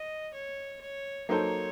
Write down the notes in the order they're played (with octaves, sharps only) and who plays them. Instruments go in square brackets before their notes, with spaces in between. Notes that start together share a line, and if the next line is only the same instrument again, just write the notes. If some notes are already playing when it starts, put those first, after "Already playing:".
Already playing: [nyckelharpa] D#5
C#5
C#5
[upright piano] F#3 A#3 D#4 A4 C5 [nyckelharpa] C#5